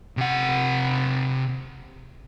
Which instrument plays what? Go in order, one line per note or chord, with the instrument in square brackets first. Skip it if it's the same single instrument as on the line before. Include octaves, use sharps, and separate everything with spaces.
[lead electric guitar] C3 F#5